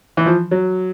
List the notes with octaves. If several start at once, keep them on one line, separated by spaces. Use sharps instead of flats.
E3
F3
F#3